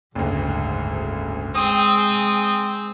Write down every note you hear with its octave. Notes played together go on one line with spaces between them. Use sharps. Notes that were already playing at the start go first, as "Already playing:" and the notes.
F#1 D2 G#2
G#3 C4 G5 D#6